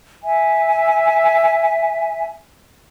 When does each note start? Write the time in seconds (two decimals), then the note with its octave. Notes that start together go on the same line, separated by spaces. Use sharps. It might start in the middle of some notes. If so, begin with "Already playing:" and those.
0.22 E5 G#5